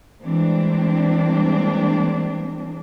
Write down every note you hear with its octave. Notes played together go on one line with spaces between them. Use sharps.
E3 G3 G#3 A#3 C4 D4